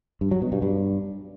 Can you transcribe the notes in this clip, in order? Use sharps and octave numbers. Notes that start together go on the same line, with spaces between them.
G2
F#3
B2
G2
G2